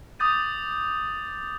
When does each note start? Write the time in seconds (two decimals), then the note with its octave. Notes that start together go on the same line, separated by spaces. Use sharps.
0.19 D6 D#6 G6 A6 D#7